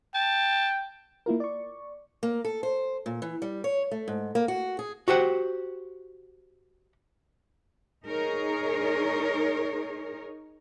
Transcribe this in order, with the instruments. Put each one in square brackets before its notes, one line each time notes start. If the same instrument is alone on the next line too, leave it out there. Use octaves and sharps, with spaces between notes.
[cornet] G5 [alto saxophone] A5
[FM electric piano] A#3 E4 F4 A#4
D5 C#6
[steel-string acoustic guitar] A#3
A4
C5
A#2
E3
G3
C#5
A3
G#2
A#3
F#4
G#4
[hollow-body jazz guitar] F#4 G4 C5 F#5
[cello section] D#4 G#4 A#4 C#5